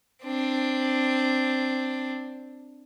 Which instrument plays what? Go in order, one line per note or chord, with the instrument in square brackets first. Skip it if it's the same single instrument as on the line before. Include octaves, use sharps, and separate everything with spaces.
[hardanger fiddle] C4 D4